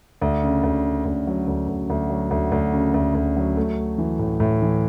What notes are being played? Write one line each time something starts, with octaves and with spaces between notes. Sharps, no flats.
D2
C#3
D2
C#3
D2
F#3
D2
D2
D2
F#3
D2
D2
C#3
D2
D2
F#3
A3
A3
E3
A2
A2
E3